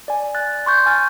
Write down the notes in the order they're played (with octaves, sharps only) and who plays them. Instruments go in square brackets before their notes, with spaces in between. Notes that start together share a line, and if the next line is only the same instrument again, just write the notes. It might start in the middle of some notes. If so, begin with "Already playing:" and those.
[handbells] D5 G#5
[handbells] F#6 [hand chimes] A6
[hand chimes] C6 C#6 G6
[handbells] G#5 F6 A6